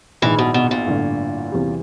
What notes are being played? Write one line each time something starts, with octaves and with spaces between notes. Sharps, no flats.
A#1 G#2 D#3 E3
B2
B2
A#2
A1 G2 D3
E2 C3 E3 G3